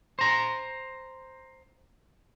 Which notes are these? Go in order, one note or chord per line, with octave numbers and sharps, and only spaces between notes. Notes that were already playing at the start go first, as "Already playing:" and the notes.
C5 A#5